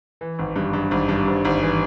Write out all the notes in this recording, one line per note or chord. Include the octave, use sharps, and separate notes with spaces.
E3
G#1
G2
G2
G#1
G2
G#1
G#1
E3